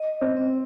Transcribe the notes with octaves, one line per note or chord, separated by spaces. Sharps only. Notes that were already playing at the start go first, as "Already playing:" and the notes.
Already playing: D#5
C4
C4